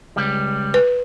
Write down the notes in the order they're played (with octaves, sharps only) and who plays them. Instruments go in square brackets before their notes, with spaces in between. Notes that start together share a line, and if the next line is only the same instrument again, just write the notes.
[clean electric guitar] C#2 G3
[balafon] B4